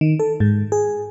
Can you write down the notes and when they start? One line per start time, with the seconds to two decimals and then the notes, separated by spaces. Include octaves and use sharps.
0.01 D#3
0.20 A4
0.40 G#2
0.72 G#4